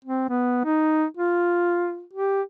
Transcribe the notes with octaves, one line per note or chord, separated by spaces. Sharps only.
C4
B3
D#4
F4
G4